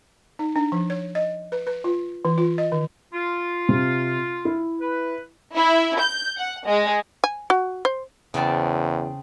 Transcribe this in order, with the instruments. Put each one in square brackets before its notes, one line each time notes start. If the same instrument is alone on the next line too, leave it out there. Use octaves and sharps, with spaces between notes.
[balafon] D#4
D4
F3
C#5
D#5
B4
B4
F4
E3
F4
D#5
D#3
[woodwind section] F4
[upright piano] C3
E4
[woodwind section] B4
[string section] E4
G6
F#5
G#3
[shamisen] G#5
F#4
C5
[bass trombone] E2 [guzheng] C#3 C4 A5